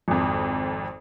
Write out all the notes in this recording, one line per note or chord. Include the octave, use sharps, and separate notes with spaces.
G#1 F2